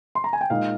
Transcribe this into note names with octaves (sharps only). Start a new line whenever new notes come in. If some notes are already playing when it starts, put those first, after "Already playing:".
C6
A#5
G#5
G5
A#2 G#3 D#4 F5